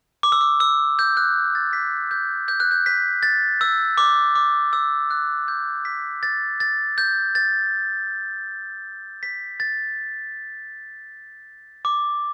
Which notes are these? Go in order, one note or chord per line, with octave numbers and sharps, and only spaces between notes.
D6
E6
D6
E6
G6
F#6
A6
B6
G6
G6
F#6
G6
B6
A6
E6
D6
D6
E6
F#6
G6
B6
A6
A6
G6
A6
B6
A6
D6